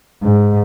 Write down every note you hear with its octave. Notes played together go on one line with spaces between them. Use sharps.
G#2